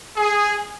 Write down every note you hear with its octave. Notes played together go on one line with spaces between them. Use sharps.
G#4